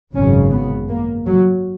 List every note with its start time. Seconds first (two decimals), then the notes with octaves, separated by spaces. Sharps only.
0.15 G#1 F#2 C#3 C#4
0.51 B3
0.89 A#3
1.26 F#3